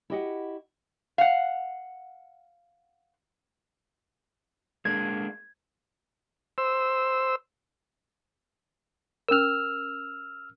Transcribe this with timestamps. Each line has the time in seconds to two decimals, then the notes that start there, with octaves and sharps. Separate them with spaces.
0.10 E4 F#4 G4 D#5 E5 F#5
1.18 F5 F#5
4.85 G#3 A#3 D4 G#6
6.58 C5 E6
9.29 C#4 A#4 E6 F6